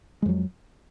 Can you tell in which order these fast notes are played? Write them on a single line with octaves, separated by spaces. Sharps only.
G#3 F2 F#3